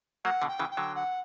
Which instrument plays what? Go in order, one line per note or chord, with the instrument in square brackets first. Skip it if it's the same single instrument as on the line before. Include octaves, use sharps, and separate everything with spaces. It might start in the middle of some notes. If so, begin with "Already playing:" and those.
[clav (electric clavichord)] F#3 A#3 [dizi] F#5
[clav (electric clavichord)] B2 D3
[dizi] G5
[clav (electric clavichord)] C#3 E3
[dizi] G5
[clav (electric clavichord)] D3 F#3
[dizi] F#5